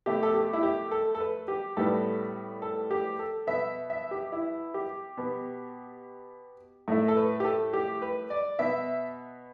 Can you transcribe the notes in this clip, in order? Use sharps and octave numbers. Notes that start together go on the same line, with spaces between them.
B2 A3 G4
A4
G4
E4
G4
A4
A4
B4
G4
A2 G3 B3 A4
A4
G4
A4
B2 B3 E5
E5
G4
E4
G4
B2 B3
A2 A3
A4
B4
G4
A4
G4
B4
D5
B2 B3 E5